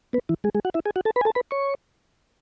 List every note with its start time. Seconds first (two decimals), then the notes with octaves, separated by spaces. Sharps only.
0.13 B3 B4
0.29 E3 E4
0.44 G#3 G#4
0.55 G#3 G#4
0.65 F#4 F#5
0.74 E4 E5
0.86 G#4 G#5
0.96 F#4 F#5
1.05 A4 A5
1.16 B4 B5
1.21 G#5
1.25 A4 A5
1.35 B4 B5
1.51 C#5 C#6